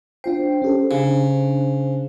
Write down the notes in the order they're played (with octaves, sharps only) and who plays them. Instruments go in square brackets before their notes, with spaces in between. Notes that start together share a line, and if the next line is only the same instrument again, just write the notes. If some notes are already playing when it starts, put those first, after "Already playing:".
[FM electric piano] D4 F4 G5 [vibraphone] C5
[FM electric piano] C#4 G4 A4
[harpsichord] C#3 [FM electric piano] D4